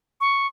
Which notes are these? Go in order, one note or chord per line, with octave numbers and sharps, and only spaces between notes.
C#6